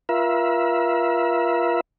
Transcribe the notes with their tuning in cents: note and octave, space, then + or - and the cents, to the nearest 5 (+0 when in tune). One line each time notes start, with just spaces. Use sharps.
F4 -10 A#4 +40 E5 +0